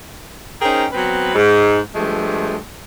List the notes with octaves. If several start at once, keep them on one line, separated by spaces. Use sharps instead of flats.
C#4 D#4 G#4 A#4 C5 G5
F#3 B3 C4 B4
G#2
G2 F3 G#3 A3